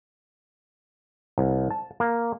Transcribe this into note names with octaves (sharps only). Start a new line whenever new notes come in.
C2
A5
A#3